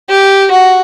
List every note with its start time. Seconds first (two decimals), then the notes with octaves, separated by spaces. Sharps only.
0.09 G4
0.51 F#4